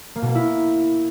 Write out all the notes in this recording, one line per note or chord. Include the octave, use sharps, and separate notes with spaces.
A#3
B2
A#3
E4